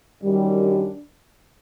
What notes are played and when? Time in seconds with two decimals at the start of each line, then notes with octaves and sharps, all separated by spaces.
0.23 F#2 D#3 G3
0.63 D4